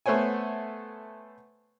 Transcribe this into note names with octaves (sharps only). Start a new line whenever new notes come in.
A3 B3 C5 C#5 G#5